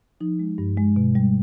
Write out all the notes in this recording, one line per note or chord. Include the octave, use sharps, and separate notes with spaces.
F3 D#4
G#3
G2
G#3
B2
G3